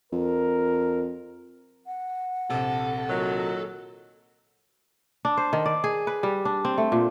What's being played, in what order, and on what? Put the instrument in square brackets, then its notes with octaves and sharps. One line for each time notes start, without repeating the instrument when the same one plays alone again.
[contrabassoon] F2 [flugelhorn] A#4
[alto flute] F#5
[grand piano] A#1 C3 [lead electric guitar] A4
[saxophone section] A#2 D#3 F#3
[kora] D4
C5
D#3
D5
G#4
B4
G3
D4
C4
A3
A#2